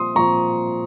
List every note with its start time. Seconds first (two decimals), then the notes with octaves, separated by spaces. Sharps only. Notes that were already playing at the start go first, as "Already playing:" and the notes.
Already playing: A#2 F3 C4 C6 D#6
0.15 A#2 F3 C4 A#5 C#6